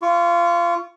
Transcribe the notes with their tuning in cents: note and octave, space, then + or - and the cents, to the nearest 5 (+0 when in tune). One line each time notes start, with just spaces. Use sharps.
F4 -20 C#6 +15